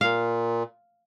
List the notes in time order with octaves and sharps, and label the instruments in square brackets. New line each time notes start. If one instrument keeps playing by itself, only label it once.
[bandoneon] A#2 [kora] F5